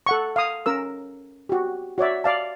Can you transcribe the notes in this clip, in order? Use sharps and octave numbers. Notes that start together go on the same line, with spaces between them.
A4 F#5 C#6
F5 D#6
C#4 A#4 E6
F#4 G4
F#4 C#5 D5 E5
D5 F5 A5